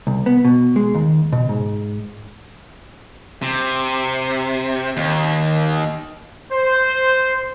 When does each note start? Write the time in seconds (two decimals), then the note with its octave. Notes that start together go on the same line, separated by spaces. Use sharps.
0.07 C2
0.26 B3
0.45 B2
0.76 G#3
0.95 D#2
1.33 B2
1.49 G#2
3.42 C3
4.97 D#2
6.52 C5